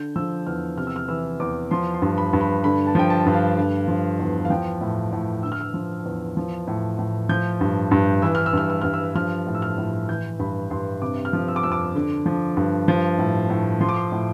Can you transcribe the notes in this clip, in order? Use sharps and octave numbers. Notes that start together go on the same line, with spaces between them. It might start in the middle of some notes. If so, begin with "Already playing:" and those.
Already playing: D3 G6
F3 E6
E2 F6
C3 F6
E6
F6
E3 E6
E2 D6
F3 C6
C6
G2
B5
G2
B5
D3 B5
A5
F3 G5
A5
G2
F5
D3
F3
E2
F5
F3 G5
A2
A2
D3 E6
F6
E6
F3
E2
F3
A2
A2
F3 G6
G2
G2
E3 E6
F6
E6
G2 F6
E6
G2 F6
E6
F3 F6
A2
E6
F6
A2
E3 G6
G2 B5
G2 C6
C3 D6
F6
F3
E6
D6
F2 E6
D6
D3
F3
G2
F3
A2
A2
F3 C6
D6
C6
A2